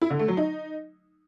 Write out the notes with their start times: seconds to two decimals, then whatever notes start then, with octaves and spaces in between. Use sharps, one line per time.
0.02 E4
0.10 D3
0.19 A3
0.28 F#3
0.37 D#4